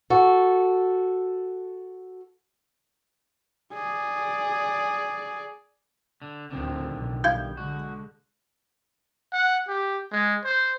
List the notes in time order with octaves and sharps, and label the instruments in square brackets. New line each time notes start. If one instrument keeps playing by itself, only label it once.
[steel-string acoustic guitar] F#4 A4
[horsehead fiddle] G#4 D5
[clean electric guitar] D3
[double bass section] D2 A2 C4 [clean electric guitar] D3 D#3 F3
[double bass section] B1
[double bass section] G3 [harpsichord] E4 F5 G#5 [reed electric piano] G6
[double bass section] D3 G#3 [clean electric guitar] F#4
[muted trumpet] F#5
G4
G#3
C5